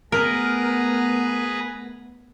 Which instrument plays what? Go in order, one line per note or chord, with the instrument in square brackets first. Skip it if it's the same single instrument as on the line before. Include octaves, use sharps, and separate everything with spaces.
[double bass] A3 B3 [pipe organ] G#4 B4 A#5 [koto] A#4